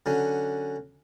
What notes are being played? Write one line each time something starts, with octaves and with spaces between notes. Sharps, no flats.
D3 F#3 C#4